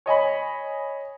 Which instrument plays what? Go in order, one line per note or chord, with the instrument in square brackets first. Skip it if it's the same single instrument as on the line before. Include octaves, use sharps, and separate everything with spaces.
[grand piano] C#5 D#5 G#5 B5